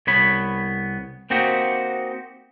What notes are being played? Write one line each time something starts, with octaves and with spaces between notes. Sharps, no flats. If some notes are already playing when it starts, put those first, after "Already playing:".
C2 B3 C#5 B5
A#3 C4 D#4 F#4 G4